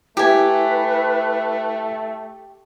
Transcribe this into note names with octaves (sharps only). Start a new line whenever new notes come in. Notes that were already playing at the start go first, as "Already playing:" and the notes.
A3 E4 G4 B4 G#5